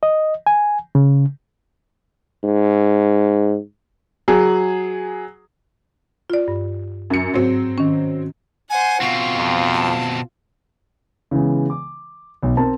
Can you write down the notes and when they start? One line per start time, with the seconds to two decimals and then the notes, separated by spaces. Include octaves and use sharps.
0.03 D#5
0.47 G#5
0.95 C#3
2.43 G#2
4.28 F#3 G#4
6.30 F4 D5
6.48 G2
7.10 F#2 C#7
7.34 G#2 F#3 C4
7.78 D#3 C#4
8.70 C5 F#5 G#5
9.01 B2 C4 F4 C#6
9.36 F2
9.73 A5
11.31 C#3 E3 G#3 B3
11.70 D6
12.43 B1
12.57 C4 A#4 A5